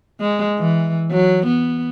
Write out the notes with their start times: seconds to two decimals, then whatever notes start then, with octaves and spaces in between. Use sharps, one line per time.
0.20 G#3
0.59 E3
1.11 F#3
1.47 B3